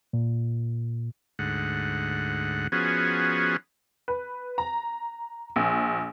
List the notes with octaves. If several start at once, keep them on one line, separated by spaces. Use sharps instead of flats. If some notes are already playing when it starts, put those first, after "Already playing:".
A#2
D2 G#2 F#5
F3 B3 C#4 F#4 G#4
B4
A#5
A#1